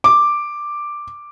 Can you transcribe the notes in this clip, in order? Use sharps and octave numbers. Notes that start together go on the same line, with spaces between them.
D6